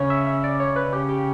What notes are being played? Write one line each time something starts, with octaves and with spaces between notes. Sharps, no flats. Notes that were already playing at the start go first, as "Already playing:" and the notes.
Already playing: C#3 C#5
E5
E5
D5
C#5
B4
C#3 G4
G4